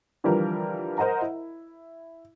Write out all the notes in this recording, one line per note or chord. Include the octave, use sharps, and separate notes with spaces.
D3 E3 F3 G3 F4 A#4
A#4 C5 D#5 F#5 A#5
E4